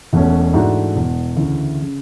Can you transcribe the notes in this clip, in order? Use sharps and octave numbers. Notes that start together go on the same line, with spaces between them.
E1 E2 B2 A3 C#4
G#2 E3 A3 D4 F#4
E1 E2 B2
D2 C#3 E3
C#3